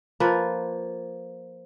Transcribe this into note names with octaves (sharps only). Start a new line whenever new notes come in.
F3 A#3 B4